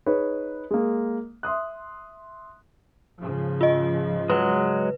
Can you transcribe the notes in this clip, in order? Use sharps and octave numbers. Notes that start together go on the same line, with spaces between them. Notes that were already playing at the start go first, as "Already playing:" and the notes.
D#4 G#4 B4 C#5
G#3 A#3
E5 C6 D#6 F#6
G#2 C#3 F3
F4 D#5
F#3 G#3 B4